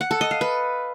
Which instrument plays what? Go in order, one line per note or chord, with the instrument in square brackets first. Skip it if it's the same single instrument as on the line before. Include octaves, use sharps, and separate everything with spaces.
[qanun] F#5
A4
D#5
F5
B4